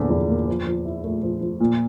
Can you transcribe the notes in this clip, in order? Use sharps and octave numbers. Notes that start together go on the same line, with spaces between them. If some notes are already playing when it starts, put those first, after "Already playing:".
Already playing: E2 D3 F3 A#3
E2
A#3
F3
F3
E4
A3
F3
F3
A#2